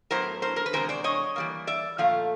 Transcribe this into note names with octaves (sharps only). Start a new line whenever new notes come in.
A2 F#3 B3 E4 A#4 C5
A#4 C5
A#4
B4
E2 C3 F3 G#3 A#4 C5
C5 D5
C#5 D#5
E3 G3 A#3
D5 E5
A#2 F3 A3 F5